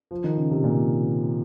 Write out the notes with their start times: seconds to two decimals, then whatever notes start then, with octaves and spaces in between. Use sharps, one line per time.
0.11 F3
0.24 D#3
0.37 C#3
0.51 C3
0.64 A#2